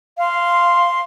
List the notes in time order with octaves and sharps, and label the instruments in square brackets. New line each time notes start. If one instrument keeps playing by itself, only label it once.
[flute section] F5 C6